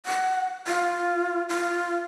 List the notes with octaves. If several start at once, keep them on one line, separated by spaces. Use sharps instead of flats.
F#5
F4
F4